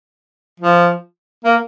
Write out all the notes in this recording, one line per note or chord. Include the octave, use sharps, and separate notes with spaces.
F3
A#3